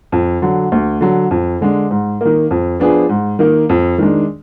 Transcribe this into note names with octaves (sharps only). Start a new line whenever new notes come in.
F2
D3 F#3
D2
D3 F#3
F2
D3 G#3 D4
G#2
D#3 A#3
F2
F3 B3 D4 G#4
G#2
D#3 A#3
F2
D#3 G#3 D4